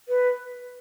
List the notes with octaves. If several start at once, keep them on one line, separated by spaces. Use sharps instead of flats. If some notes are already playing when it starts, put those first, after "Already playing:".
B4